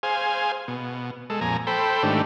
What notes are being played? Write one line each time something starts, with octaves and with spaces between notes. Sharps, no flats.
G#4 C5 F5 G#5
B2
G#3 A4
F2 A#2 G#5 A#5
A4 C5 G5 B5
G#2 D#3 A3 D4 G4